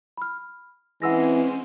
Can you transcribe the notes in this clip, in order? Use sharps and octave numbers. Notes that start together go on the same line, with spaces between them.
B5 F6
E3 G#3 C4 C#4 F#5 E6 A#6